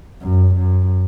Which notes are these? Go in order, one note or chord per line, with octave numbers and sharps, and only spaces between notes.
F#2
F#2